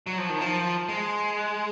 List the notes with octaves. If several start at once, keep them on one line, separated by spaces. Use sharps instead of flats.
F#3
F3
D#3
F3
G#3